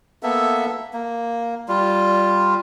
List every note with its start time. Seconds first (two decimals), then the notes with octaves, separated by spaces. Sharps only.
0.23 A#3 B3 A4 E5
0.93 A#3
1.68 G3 F4